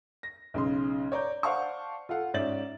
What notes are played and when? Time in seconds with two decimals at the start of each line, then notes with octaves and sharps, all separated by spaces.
0.23 A#6
0.54 B1 C#3 C6
1.12 C#5 D5 A#5 G6
1.43 C5 D5 F5 F#5 A5 C#6
2.09 F4 A4 F5 F#5
2.34 G#2 C#4 D5 E5 A6 F#7